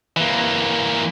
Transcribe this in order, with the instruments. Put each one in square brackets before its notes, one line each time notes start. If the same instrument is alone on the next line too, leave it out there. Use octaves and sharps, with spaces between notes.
[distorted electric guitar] E3 A#3